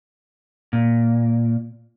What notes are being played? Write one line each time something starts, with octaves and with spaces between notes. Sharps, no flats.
A#2